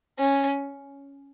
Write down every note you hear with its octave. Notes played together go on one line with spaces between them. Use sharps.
C#4